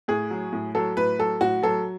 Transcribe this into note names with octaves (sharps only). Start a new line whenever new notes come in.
A2 G#4
F#3
A2
F#3 A4
A2 B4
F#3 A4
A2 F#4
F#3 A4